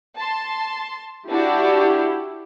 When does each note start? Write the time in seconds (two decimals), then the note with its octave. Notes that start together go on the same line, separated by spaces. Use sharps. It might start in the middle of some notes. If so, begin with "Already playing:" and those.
0.17 A5 C6
1.29 D4 E4 F#4 G4